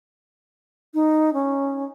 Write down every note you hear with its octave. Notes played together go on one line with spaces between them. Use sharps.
D#4
C#4